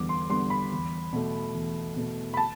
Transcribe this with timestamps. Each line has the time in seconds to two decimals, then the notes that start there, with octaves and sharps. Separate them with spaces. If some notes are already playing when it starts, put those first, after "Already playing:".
Already playing: E2 D3 G3 B3 D6
0.09 C6
0.29 D3 G3 B3 C6
0.50 B5
0.72 E2
1.13 B2 A3
1.54 E2
1.96 B2 A3
2.34 B5
2.37 A5